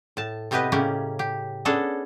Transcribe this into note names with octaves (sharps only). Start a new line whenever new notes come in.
A2 A5
A2 C3 B3 G4 B4 D#5
A2 C#3 A#3 C#4 G4
G4
B3 C#4 D4 G#4 A4